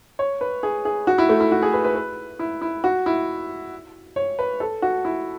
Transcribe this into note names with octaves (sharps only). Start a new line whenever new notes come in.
C#5
B4
G#4
G#4
F#4
E4
A3
E4
F#4
G#4
B4
B4
B4
E4
E4
F#4
E4
C#5
B4
A4
F#4
E4